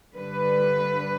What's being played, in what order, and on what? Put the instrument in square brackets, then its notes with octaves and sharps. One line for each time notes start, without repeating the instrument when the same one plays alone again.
[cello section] G2 D3 G3 B4